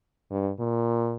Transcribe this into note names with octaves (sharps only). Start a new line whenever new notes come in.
G2
A#2